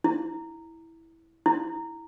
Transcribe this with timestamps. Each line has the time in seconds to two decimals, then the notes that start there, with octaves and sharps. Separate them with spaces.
0.04 E4
1.46 E4